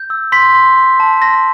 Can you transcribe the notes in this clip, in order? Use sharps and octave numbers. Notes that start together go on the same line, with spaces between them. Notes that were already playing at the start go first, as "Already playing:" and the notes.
Already playing: G6
E6
C6 B6
C6
C6
A5
C6 A#6